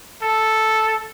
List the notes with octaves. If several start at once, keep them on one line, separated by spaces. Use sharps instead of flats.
A4